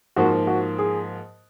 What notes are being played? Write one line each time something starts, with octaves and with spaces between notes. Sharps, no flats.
G#2 F3 A#3 F#4
F#4
G#4